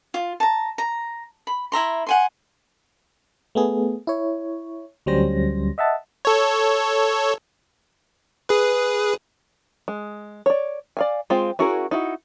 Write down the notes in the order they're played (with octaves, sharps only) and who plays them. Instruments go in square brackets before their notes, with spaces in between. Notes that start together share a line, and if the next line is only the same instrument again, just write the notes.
[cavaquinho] F4
A5 A#5
A#5
B5
E4 E5 A#5 C6
F#5 G#5 C6
[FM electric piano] A3 B3 G#4
E4 C#5
D2 F#3 G3 C#4 C5 A#6
D#5 E5 F#5 A5
[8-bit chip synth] A4 C#5
G#4 B4
[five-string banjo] G#3
C#5 D5
D5 F5 G#5
G#3 C4 F4 C5
C#4 E4 F#4 G#4 A#4
D#4 E4 F#4